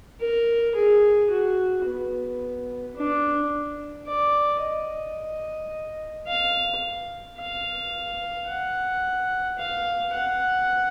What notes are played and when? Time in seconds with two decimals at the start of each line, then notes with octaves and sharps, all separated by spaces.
0.20 A#4
0.75 G#4
1.30 F#4
1.85 B3
2.96 D4
4.06 D5
4.61 D#5
6.27 F5
7.38 F5
8.47 F#5
9.58 F5
10.13 F#5